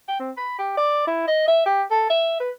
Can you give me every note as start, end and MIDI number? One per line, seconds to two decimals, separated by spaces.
0.08 0.18 79
0.20 0.31 60
0.37 0.58 83
0.59 0.74 67
0.77 1.02 74
1.07 1.27 64
1.28 1.44 75
1.47 1.64 76
1.66 1.83 67
1.91 2.06 69
2.10 2.36 76
2.40 2.51 71